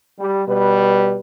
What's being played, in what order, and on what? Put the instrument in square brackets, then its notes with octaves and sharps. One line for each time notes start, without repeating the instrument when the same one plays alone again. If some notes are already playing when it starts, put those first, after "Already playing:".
[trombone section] G3
B2 G3 B4